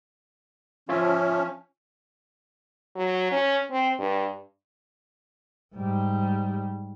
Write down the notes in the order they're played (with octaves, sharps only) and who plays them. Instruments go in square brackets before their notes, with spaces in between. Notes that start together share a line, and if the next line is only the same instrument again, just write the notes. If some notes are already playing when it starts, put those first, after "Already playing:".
[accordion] F3 C#4 [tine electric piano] F4 C#5 E5
[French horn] F#3
C#4
C4
G2
[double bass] G#2 G3